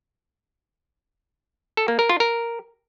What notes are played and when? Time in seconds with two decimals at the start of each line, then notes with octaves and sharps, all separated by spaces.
1.77 A4
1.88 A#3
1.99 A#4
2.09 F4
2.20 A#4